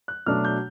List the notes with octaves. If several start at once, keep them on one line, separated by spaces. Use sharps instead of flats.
F#6
B2 F#3 A3 D4 F6
G6